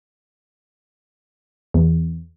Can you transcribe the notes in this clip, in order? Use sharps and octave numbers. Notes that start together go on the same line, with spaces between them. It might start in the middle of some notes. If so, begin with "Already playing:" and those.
E2